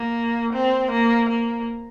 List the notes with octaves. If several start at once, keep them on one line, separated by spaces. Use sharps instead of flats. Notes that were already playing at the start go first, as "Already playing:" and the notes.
Already playing: A#3
C4
A#3
A#3